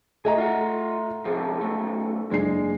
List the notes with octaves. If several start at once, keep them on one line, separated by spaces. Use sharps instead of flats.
A3 G#4 D#5 E5 A#5
F4 F#5
G#2 C3 F3 G#4
B1 F2 A3
F#1 G#3 D4 C7